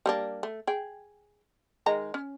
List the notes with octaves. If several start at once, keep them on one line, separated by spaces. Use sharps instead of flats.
G3 A#3 D4
A3
G#4 G5
D#3 G#3 A#5
C#4